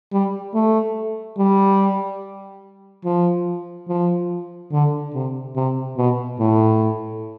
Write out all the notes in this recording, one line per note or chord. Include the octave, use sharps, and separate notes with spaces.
G3
A3
G3
F3
F3
D3
C3
C3
B2
A2